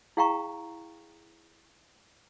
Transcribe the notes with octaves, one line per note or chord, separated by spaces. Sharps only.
E4 G#4 F5 G5 A#5 C#6